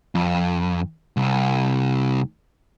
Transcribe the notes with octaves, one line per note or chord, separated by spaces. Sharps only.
F2
C2